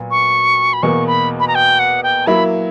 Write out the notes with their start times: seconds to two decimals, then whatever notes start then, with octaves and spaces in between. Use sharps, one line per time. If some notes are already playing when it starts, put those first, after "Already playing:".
Already playing: A#2 F#3 B3
0.11 C#6
0.73 B5
0.83 E2 B2 A#3 C#6
1.07 B5
1.40 B5
1.48 A#5
1.55 G5
1.79 F#5
2.03 G5
2.27 F#3 A#3 E4 B5